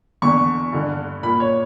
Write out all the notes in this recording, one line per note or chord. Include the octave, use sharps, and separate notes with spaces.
E2 D3 C#6
G2 D3
A#2 B5
C#5